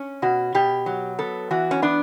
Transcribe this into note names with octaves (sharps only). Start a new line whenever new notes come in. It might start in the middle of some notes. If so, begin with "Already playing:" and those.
Already playing: C#4
B2 F#4
B2 G4
F#3
B3 A4
E3 F#4
C#4
B3 D4